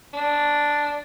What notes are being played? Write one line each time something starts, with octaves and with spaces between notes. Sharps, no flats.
D4